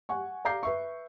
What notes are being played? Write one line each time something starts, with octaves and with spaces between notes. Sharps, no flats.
F#5 G#5 C#6
D5 F5 A#5 D6 G6 C7
B4 E5 C#6